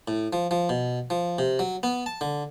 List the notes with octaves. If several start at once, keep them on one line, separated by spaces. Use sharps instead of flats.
A2
F3
F3
B2
F3
C3
F#3
B3
A5
D3